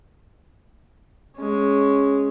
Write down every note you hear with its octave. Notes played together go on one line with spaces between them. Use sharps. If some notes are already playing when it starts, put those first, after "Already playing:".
G#3 C#4